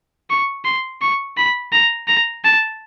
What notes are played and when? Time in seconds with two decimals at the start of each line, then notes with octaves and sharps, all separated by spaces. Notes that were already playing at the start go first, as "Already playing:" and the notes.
0.30 C#6
0.65 C6
1.02 C#6
1.37 B5
1.72 A#5
2.08 A#5
2.45 A5